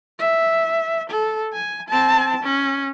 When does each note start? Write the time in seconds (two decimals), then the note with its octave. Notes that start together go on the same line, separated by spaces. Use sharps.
0.19 E5
1.10 A4
1.53 G#5
1.89 C4 A5
2.43 C#4